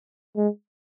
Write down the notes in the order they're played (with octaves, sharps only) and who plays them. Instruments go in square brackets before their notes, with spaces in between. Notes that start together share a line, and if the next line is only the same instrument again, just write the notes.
[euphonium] G#3